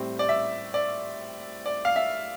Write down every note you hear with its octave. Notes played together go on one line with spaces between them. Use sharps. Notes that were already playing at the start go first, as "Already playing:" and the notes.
Already playing: A2 G3 C4
D5
E5
D5
D5
F5
E5